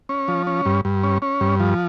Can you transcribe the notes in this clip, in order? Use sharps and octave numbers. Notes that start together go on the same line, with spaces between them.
C#4
F3
C#4
G2
G2
C#4
C#4
G2
F3